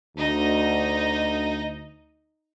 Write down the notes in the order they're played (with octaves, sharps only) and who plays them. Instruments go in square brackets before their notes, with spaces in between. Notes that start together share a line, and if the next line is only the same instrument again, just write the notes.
[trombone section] D2 [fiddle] D#4 D#5